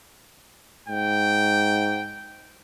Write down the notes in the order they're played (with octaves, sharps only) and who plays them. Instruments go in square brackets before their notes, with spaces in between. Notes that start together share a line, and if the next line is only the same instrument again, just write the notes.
[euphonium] G#2 [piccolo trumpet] G5